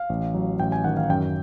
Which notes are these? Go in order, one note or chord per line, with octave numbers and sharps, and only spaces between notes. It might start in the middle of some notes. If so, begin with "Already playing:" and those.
Already playing: F5
A1
F#3
A1 G5
G#5
D#3 F#5
F5
F#2 G5